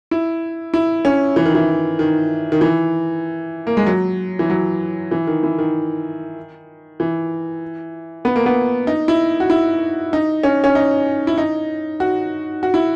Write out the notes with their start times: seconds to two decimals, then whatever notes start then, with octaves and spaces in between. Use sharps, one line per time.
0.11 E4
0.74 E4
1.05 C#4
1.36 E3
1.45 D#3
1.55 E3
1.99 D#3
2.52 D#3
2.61 E3
3.67 A#3
3.77 G#3
3.87 F#3
4.39 E3
4.50 F#3
5.11 E3
5.27 D#3
5.43 E3
5.59 D#3
7.00 E3
8.25 B3
8.36 A#3
8.46 B3
8.87 D#4
9.08 E4
9.40 F#4
9.50 E4
10.13 D#4
10.43 C#4
10.64 C#4
10.75 D#4
11.27 E4
11.38 D#4
12.00 F#4
12.63 F#4
12.74 E4